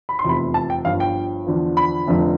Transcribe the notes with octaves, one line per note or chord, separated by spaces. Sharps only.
B5
C6
F1 E2 C3 F3 B5
A5
G5
G1 G2 F3 F5
G5
E2 D3 F3
B5
F1 F2 D3 F3